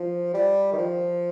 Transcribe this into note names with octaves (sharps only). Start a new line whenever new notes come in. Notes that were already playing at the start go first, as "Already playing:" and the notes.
Already playing: F3
G3
D#3
F3